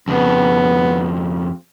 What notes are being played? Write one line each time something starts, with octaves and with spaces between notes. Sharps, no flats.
F2 C#3 B3